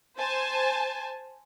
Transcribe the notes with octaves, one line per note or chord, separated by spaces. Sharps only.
C5 G#5 A5